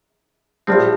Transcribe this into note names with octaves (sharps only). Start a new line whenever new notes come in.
A#1 A2 F3 G3 C4